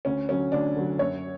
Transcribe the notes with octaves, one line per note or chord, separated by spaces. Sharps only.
D2 C#4
D3 F#3 C#4
D2 D4
D3 F#3
F#2 C#5